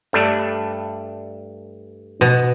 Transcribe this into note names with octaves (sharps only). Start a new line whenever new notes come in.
G2 A3 D4
B2